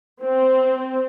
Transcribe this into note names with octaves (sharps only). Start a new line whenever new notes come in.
C4